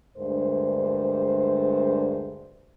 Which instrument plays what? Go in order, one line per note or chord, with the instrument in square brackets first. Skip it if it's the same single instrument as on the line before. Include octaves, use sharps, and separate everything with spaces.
[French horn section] D2 G2 G#3 A#4 C5